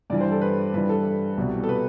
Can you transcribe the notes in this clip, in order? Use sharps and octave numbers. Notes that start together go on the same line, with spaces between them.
G2 E3 G3 D5
C5
A4
B4
G2 E3 G3 B4
A4
C2 B2 G3
A4
B4